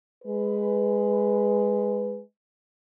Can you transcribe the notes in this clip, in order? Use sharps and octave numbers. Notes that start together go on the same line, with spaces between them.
G#3 B4